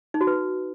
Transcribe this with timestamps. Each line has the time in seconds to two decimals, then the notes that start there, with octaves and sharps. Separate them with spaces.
0.14 D#4
0.21 F#4
0.27 B4